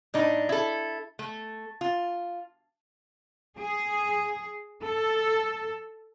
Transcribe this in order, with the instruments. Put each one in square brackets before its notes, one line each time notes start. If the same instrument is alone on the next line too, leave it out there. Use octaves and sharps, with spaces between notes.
[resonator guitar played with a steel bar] A2 D4 D#4
E4 A4
A3
F4
[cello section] G#4
A4